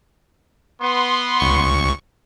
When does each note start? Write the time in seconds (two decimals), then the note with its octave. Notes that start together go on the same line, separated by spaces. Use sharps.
0.81 B3 C6
1.40 C#2 C#6